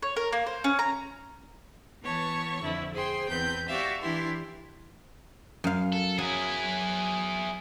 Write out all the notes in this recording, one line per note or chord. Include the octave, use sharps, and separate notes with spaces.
C#5
A#4
A#3
C5
C#4
A#5
E3 B3 C#5 A5 C#6
F2 D3 E4
G#4 C5 G5 C6
E2 C4 B4 G6
F#4 G4 D5 E5 F5
E3 D4 E4 G4 C6
F#2 F5
A4
F#3 E4 G#4